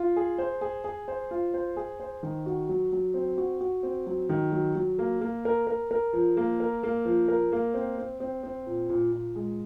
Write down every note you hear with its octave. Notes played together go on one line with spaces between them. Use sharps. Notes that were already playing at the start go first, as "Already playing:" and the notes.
Already playing: F4
G#4
C5
G#4
G#4
C5
F4
C5
G#4
C5
D#3
F#4
F#3
F#3
C4
F#4
F#4
C4
F#3
D#3
F#3
F#3
A#3
A#3
A#4
A#4
A#4
F3
A#3
A#4
A#3
F3
A#4
A#3
C4
C4
C4
C4
A#2
A#2
A#2
G#3